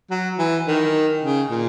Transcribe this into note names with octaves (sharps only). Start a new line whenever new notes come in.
F#3
E3
D#3
C#3
A#2